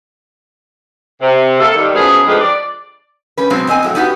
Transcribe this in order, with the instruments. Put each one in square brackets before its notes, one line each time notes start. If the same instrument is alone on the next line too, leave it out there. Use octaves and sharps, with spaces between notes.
[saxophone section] C3
A#3 A4
D#3 G3
F#2 A2 F3 B3 G#4
D3 D#3 F3 G#3 G4 B4
D5
[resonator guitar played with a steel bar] G3 C#4 B4
B2 F#3 G#3 B3 C4
A#2 C4 D#5 G#5
A2 F#3 A3
B3 D#4 F#4 G4 B4